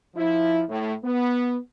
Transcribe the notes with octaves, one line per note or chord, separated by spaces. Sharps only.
F3 E4
A2
B3